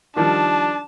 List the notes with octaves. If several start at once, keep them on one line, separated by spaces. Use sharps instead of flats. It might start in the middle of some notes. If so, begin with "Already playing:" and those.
D#3 F3 G3 D4 A5